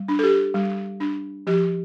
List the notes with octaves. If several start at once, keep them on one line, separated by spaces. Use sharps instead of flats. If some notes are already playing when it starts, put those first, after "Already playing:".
Already playing: G3
D4
A4
G4
G3
D4
F3 G4